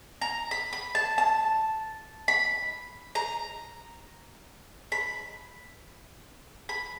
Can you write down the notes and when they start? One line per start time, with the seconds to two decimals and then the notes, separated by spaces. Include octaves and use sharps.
0.21 A#5
0.51 B5
0.73 B5
0.95 A5
1.18 A5
2.28 B5
3.15 A#5
4.92 B5
6.69 B5